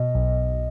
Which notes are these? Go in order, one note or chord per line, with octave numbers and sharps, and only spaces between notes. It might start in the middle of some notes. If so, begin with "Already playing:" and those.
Already playing: B2 D#5
B1